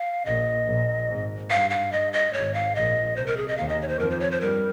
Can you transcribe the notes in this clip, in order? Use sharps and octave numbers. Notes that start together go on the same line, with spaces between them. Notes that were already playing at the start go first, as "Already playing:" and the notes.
Already playing: F5
A#1 A#2 D#5
A#1 A#2
G#1 G#2
G2 F5
F5
G2 D#5
D#5
G#1 G#2 C#5
F5
A#1 A#2 D#5
C2 C3 C5
A#4
G#4
D#5
D#2 D#3 F5
D#5
C#5
C5
F2 F3 A#4
C5
C#5
C5
G2 G3 A#4